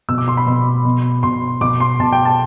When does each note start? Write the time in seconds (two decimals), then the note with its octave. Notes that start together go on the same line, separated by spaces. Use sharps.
0.08 B2 E6
0.18 D6
0.28 C6
0.37 B5
0.47 B2
0.85 B2
1.23 B2 C6
1.61 B2 D6
1.80 C6
2.00 B2 A5
2.12 G5
2.25 A5